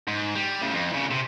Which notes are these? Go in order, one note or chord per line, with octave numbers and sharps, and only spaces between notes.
G#2
G3
A2 C#3
F2
E2 C#3
C3